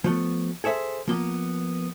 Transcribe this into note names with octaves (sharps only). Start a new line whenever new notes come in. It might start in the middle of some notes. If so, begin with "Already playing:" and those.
F3 A3 B3
G#4 A4 C5 E5
F3 A#3 B3